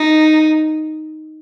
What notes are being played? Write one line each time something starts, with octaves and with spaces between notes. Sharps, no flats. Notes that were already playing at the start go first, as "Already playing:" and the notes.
Already playing: D#4